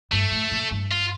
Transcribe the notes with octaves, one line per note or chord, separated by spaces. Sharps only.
G2 A3
A2
A#2
G2
F4